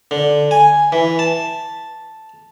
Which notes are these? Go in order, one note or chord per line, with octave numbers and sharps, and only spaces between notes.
D3
G#5
E3
A5